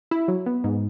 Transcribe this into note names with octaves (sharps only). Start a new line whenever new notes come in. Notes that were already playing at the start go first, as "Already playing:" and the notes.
E4
F#3
B3
G#2